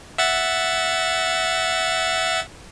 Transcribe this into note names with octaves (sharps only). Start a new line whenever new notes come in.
E5 F#5 A6